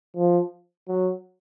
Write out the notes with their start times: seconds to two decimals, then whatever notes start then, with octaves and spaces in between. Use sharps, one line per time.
0.16 F3
0.88 F#3